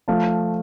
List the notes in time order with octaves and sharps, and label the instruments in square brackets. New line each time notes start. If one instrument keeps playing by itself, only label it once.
[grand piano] F3 A3 F5 A5